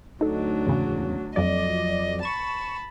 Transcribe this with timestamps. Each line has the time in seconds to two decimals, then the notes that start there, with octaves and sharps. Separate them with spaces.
0.21 D2 F#3 D4 D#4 A4
0.67 E2 G#2 C#3
1.36 F2 F#3 D5 D#5
2.23 A5 B5 C#6 E7